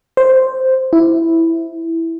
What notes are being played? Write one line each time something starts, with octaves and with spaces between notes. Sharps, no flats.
C5
E4